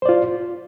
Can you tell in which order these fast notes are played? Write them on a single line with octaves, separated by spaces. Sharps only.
C5 D5 F4